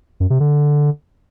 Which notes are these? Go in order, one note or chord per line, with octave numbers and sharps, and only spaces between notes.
F#2
C3
D3